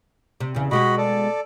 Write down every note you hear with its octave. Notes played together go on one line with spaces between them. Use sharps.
C3
E2 C#3
B2 G#3 F#4 G4 D#5 B5
A4 D5